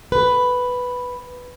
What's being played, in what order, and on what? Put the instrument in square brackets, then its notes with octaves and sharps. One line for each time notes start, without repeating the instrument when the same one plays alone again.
[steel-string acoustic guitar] B4